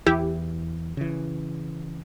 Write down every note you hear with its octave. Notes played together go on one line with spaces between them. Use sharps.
E2 E3 E4 G4
C#3 E3